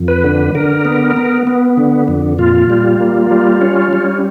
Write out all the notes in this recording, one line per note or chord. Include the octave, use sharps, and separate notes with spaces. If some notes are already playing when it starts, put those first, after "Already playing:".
Already playing: F2
B4
D3
D3 A#4
B3
B3
B3
D3
F2
A#2 F4
G3
A#3
G3
C#4
G3